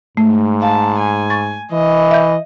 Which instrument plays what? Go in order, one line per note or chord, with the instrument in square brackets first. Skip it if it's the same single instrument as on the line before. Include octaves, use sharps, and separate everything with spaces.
[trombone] G#2 [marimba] A3
[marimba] F5 [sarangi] A5
[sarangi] G#5
[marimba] C#6 A6
[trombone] E3 [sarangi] D#5
[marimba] E5 G6